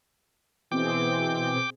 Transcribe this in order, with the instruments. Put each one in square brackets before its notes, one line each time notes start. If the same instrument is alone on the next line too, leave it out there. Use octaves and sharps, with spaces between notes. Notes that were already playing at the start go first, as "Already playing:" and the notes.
[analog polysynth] B2 C4 G#4 [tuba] E3 [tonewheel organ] G5 D6